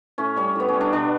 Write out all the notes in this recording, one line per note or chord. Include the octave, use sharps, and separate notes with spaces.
A2 C#4
G3 C#4
A2 B3
C#4
G3
D4
B2 D4